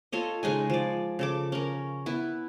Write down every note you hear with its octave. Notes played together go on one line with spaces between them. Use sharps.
F4 A4 C#5 D#5
C#3 G#3 D#4 G#5
F3 D5
C#3 A4 D6
C#4 A#4
B3 E4